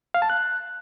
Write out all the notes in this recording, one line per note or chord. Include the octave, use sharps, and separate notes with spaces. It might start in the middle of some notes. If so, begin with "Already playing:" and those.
F5
A5
F#6